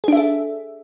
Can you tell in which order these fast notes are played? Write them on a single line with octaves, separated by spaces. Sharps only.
G#4 D4 E5 A4